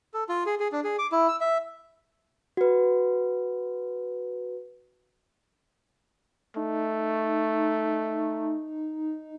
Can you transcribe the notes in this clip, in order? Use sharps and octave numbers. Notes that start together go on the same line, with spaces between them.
A4
F4
G#4
G#4
D4
G#4
D6
E4
E6
E5
F#4 B4
A3 D#4